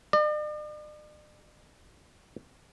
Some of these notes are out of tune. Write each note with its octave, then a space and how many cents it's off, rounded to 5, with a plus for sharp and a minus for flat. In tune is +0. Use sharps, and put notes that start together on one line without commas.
D5 +45